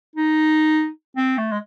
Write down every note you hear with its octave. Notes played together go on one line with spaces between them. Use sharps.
D#4
C4
A3
G#3